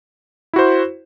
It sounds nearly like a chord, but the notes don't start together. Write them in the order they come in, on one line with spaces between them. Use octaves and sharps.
E4 F#4 C5